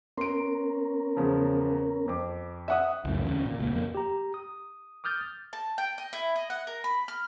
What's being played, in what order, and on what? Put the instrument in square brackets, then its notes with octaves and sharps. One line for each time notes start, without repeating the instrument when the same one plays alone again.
[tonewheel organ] B3 C#4 A#4 [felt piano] C6 D7
[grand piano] E2 C#3 F3
F2 D6
[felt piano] E5 F#5 D#6
[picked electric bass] C#2 F#2 A2
E2 D3 C4 C#4
A#2
D#1 C#2 A#2 A#3
F2 A#3
[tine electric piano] G4 A#5
D#6
D6 D#6 F6 G6 A6
[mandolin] A5
G5
D#5
E4
D#5
F#5
A#4
B5
F6